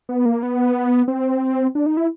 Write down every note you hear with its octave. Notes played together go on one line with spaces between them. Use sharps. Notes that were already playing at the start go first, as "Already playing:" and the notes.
B3
A#3
B3
C4
D4
D#4
E4